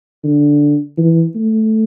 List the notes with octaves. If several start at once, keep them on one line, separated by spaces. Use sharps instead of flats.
D3
E3
A3